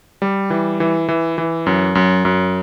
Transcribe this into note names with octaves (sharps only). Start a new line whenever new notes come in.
G3
E3
E3
E3
E3
F#2
F#2
F#2